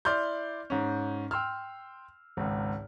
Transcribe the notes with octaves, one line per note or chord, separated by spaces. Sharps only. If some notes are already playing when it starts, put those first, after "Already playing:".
E4 D5 C6 F6 G6
G#2 C#4
G5 C6 E6 F6
G#1 C#2